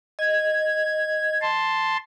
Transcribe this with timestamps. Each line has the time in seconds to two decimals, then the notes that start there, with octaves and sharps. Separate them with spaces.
0.19 D#5 G#6
1.42 A5 C6